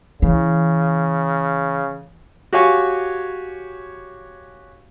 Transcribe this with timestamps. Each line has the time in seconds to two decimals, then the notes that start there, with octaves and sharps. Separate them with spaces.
0.22 C#3 E3
2.53 F#4 G4 C#5 F5 G#5 C#6